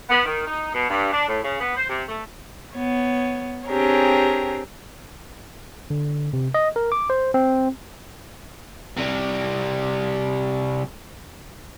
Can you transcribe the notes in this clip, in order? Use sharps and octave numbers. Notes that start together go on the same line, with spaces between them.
B3
D#3
D#4
B2
G2
D4
A2
C#3
B3
C5
C3
A3
B3 C#5
C4 D4 G4 G#4 A#4 C#5
D3
C3
D#5
A#4
D6
C5
C4
C3 G3